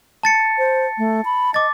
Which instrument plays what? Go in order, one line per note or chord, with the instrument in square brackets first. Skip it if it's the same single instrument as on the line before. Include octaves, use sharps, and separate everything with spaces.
[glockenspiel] A5 A6 C#7
[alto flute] C5
A3
B5
[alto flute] D#5 [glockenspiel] D6 A6